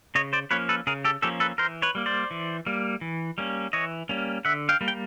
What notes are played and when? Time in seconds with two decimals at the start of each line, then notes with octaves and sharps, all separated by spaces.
0.15 C#3 C#5 D#5
0.33 C5 D5
0.51 F3 A#3 C#4 B4 C#5
0.69 A4 B4
0.87 C#3 G#4 A#4
1.04 G4 A4
1.22 F3 A#3 C#4 G4 A4
1.40 A4 B4
1.58 E3 A#4 C5
1.82 B4 C#5
1.95 G3 A#3
2.06 C5 D5
2.31 E3
2.66 G3 A#3
3.01 E3
3.38 G3 A#3 C#4
3.73 E3 C#5 D#5
4.09 G3 A#3 C#4
4.45 D3 E5 F#5
4.69 F5 G5
4.81 G3 A#3
4.88 G5